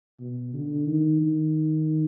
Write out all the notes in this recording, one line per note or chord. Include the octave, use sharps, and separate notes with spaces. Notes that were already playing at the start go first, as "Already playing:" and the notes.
B2
D3
D#3
D#3